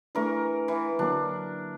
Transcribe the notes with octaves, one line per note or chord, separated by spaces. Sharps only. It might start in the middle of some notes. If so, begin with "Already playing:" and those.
E3 A3 D4 A#4 C#6
E3
D3 F#3 A#3 D4